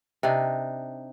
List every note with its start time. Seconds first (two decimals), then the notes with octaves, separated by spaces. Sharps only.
0.23 C3 D4 D#4